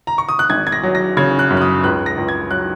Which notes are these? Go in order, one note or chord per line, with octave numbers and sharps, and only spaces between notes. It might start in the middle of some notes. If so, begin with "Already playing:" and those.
A#5
C#6
D#6
F#6
G#1 G#6
G#6
A#6
F#3
A#6
C#3 G#6
F#6
F#2
F#6
D#6
C#2 F#6
A#6
C#2
G#6
F#3 F#6